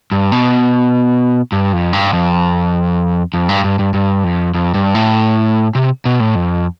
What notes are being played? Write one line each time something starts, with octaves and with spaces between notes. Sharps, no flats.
G2
B2
G2
F2
G2
F2
F2
G2
G2
G2
G2
F2
F2
G2
A2
C3
B2
A2
F2